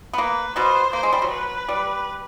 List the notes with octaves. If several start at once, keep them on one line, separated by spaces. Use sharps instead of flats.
B3
A#3 B4
B2 B3 C5
A#3 C5
G#3
G3
F#3
B4
G3